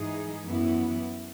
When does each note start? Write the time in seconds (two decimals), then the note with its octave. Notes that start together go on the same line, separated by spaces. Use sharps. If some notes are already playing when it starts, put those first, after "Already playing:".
Already playing: G#2 E3 G#3 D#4 G#4
0.44 F#2 E3 B3 E4